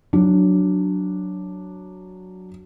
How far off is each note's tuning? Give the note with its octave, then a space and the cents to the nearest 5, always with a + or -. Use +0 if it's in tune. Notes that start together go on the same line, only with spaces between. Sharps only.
F#3 +0 D4 +0